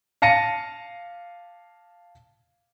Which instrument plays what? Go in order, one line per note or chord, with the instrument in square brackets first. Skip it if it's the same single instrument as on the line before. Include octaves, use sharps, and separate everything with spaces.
[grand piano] F5 A5 A#6 C#7 D#7